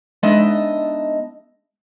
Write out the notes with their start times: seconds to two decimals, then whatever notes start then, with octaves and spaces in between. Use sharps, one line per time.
0.23 G#3 B3 D4 D#4 D#5 E5